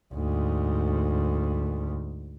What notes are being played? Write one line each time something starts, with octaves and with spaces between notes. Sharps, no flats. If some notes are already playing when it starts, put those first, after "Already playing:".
D2 G#2